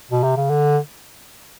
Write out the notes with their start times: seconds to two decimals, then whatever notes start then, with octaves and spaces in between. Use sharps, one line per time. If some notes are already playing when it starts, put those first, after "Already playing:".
0.11 B2
0.23 C3
0.37 C#3
0.50 D3